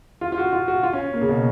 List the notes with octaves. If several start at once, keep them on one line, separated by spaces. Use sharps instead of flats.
F4
F4
F#4
F4
F#4
F4
C#4
A#3
C#3
B2